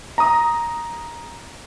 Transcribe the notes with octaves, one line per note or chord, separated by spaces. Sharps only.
A#5 D#6